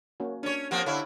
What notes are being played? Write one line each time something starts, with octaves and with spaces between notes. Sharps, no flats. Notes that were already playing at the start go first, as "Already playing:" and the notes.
A#3 C#4 F#4
C#4 D4 C#5
F3 A#3 C4 G4 F#5
D3 E4 A4 C#5 F5